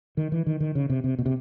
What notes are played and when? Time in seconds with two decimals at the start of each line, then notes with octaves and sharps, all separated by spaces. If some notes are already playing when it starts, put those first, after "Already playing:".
0.17 D#3
0.32 E3
0.46 D#3
0.60 D#3
0.75 C#3
0.90 C3
1.04 C3
1.19 B2
1.26 C3